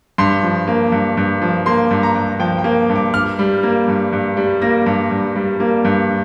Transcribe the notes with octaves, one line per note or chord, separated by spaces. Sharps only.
G2 C6
F3
A#3
G2
G2
F3
A#3 C6
G2
A#5
G2
F3 G5
G5
A#3
G2
D6
G2 F6
G3
A#3
G2
G2
G3
A#3 A#6
G2
G2
G3
A#3
G2